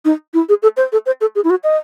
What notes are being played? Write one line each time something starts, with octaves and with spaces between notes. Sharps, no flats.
D#4
E4
G#4
A4
C5
A4
C5
A4
G#4
E4
F#4
D#5